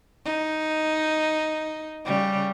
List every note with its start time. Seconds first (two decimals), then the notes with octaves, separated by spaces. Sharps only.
0.25 D#4
2.05 C#3 G3